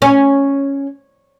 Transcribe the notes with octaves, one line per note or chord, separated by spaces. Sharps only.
C#4